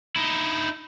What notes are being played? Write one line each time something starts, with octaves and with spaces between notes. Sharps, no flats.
D#4 E4